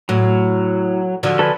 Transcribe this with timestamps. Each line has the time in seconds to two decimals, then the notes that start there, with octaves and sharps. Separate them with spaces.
0.09 A2 F#3
1.23 D3 F3 F#3
1.39 A4 B4 G#5